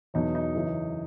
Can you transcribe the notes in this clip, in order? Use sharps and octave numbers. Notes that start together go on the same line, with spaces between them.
E2 B2 F#3 D#4
D#4
F#2 C#3 E3